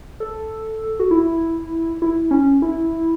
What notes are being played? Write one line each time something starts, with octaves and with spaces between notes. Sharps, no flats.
A4
F#4
E4
E4
C#4
E4